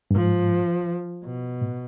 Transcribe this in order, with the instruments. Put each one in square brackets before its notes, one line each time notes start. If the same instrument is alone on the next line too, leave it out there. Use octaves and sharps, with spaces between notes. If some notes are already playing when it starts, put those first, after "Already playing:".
[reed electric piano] G2
[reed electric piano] G#2 [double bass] F3
[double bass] B2
[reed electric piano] A2